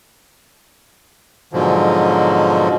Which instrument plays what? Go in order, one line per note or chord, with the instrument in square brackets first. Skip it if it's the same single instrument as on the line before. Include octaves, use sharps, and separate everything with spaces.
[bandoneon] G#2 B2 D3 F3 F#3